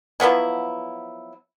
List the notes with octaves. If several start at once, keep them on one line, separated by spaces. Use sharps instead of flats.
F3 F#3 B3 E4